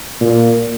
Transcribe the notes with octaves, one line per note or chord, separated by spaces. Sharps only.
A#2